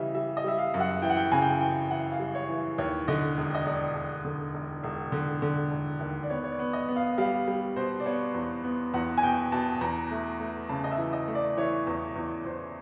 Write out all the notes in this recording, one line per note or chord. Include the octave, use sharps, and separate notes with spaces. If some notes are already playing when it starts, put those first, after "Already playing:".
Already playing: C#3 E3 G3 D#5 E5
G3 E5
D#5
G3 E5
F5
F#2
F#5
E3 G5
F#5
G5
C#3 G#5
G5
G#5
E3 G5
E3 F#5
F5
G3
C#5
E3
D#2 C#5
D3 D#5
E1
D#5
E1 D5
E1
D3
E1
E1
D3
D3
E1
D#2
D5
B3 C#5
C#5
D5
B3
D#5
B3
F5
G3 F5
G3
B2 C5
D5
B3 C#5
E2
B3
E2 F#5
G#5
B2 G5
B2 A5
E2 A#5
A3
A3
C#3 A5
D#5
E5
E3
D#5
A3
D5
E3 C#5
E2
E2
E2 C5